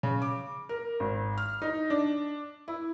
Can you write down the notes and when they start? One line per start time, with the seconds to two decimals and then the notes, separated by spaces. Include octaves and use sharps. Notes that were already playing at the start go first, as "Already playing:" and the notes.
0.03 C#3
0.22 D6
0.69 A#4
1.00 G#1
1.38 F6
1.62 D#4
1.90 D4
2.68 E4